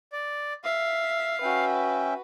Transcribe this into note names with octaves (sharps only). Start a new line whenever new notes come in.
D5
E5 F5
C#4 F#4 B4 E5 G5